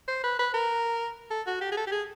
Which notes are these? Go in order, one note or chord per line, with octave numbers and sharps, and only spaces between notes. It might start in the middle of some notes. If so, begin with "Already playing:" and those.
C5
B4
B4
A#4
A4
F#4
G4
G#4
A4
G4
G#4